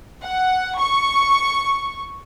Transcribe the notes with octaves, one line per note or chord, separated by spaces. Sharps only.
F#5
C#6